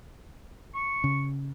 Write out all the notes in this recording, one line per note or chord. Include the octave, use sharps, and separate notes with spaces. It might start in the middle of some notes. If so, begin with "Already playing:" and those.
C#6
C#3